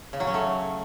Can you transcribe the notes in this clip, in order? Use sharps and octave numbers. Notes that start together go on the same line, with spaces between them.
C#3
F#3
C#4
A3